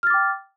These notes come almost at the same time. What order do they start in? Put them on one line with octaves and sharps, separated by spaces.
F6 A6 D6 G5